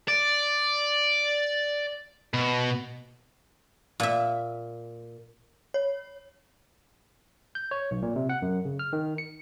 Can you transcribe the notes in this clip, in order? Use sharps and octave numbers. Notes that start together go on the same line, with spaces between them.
D5
B2
A#2 E5
C#5
G6
C#5
B1
A#2
C3
F#5
F#2
C#3
F6
D#3
C#7